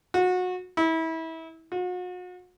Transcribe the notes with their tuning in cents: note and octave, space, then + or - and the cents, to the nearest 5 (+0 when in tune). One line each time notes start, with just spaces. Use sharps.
F#4 -25
E4 -30
F#4 -40